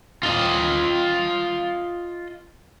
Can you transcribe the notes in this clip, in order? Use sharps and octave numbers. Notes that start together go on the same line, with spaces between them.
F4 D#5